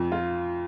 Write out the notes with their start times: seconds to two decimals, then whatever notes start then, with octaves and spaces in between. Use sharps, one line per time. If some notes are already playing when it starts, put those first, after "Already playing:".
Already playing: F2
0.12 F4